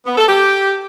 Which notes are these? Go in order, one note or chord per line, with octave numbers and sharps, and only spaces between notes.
B3
A4
G4